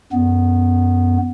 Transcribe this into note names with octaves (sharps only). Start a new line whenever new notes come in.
F#2 B3